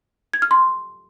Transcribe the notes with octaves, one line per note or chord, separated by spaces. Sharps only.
G#6
F6
C6